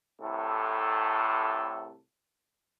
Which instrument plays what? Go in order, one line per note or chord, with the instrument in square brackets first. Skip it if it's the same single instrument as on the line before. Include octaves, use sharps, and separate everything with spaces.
[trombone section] C2 A2 C3 A4